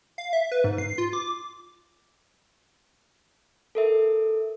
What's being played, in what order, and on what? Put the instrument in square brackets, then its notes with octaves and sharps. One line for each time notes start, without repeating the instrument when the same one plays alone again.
[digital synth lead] F5
E5
B4
G#2
C7
F4
D6
[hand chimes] A4 A#4 E5